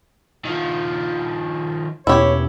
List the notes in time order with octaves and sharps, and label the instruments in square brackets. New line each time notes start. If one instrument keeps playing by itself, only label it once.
[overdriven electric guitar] D#3 F3
[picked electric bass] E2 B2 C#4 [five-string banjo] E4 G4 [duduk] C#5